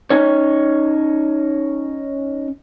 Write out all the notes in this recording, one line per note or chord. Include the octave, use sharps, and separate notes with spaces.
C#4 D#4 C#5